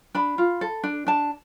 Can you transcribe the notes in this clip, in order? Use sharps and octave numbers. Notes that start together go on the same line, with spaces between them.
D4 B5
F4
A4
D4
D4 A5